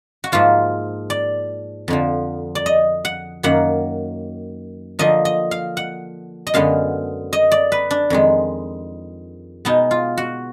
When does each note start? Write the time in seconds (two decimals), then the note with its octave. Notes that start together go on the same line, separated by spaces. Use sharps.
0.24 F#4
0.32 G#2 F3 A#3 F4
1.10 D5
1.88 F2 D3 F3
2.55 D5
2.66 D#5
3.05 F#5
3.43 F#2 D#3 A#3 F#5
4.99 D3 F3 A#3 D#5
5.25 D#5
5.51 F5
5.77 F#5
6.47 D#5
6.54 F#2 D3 G#3 B3 F5
7.33 D#5
7.52 D5
7.72 B4
7.91 D4
8.10 F2 D#3 G#3
9.65 B2 G#3 B3 D#4
9.91 F4
10.18 F#4